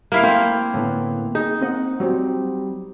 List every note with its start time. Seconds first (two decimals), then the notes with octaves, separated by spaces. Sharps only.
0.12 A#3 E4 F5
0.23 A3 C4 F5
0.74 A2 D3 B3
1.35 D#4 G#4
1.61 C4 D#5 F#5
2.00 F#3 G3 C4